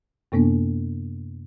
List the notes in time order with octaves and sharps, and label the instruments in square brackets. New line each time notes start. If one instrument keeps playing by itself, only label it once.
[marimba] F#2 C3 A#3 B3 D4